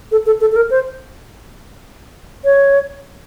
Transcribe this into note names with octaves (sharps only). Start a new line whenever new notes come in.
A4
A4
A4
A4
A#4
C5
C#5